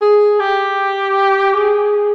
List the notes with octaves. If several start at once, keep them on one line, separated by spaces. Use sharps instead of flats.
G#4
G4
G#4